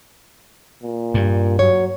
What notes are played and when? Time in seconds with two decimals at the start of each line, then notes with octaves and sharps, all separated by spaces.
0.83 A#2
1.14 G2
1.59 F#3 C#5